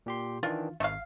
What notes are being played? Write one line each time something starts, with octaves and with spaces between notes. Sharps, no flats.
A#2 G4 C6
D#3 E3 D4 F4
G#1 A3 F5